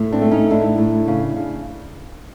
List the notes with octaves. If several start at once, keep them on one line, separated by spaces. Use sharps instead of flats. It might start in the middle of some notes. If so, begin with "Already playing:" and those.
Already playing: A2
C4 D4
A3
C#4 D#4
A2 D4 E4
A2
C#3
C#3